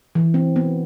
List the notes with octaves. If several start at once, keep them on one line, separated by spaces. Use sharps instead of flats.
E3
C4
B3